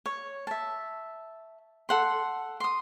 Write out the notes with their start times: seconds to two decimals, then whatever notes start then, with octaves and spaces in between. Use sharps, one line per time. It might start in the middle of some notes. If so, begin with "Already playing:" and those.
0.06 C#5
0.47 E5 A5
1.89 A4 F#5 C6
2.60 C6 D#6